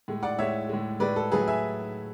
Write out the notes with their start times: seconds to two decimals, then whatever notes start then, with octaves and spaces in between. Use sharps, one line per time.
0.08 A2 G#3
0.23 D5 F#5
0.39 A2 G#3 C#5 E5
0.69 A2 G#3
1.00 A2 G#3 B4 D5
1.16 A4
1.32 A2 F#3 A3 G#4 B4
1.47 E5 G#5